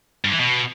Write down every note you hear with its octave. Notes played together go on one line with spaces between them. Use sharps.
G2
E3
B2